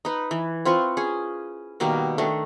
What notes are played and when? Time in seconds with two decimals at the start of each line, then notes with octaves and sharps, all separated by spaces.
0.05 D#4 B4
0.31 E3
0.65 C4 F4 B4 C#6
0.97 C#4 G#4
1.80 B2 D#3 G3 A#3
2.18 D#3 A3 D4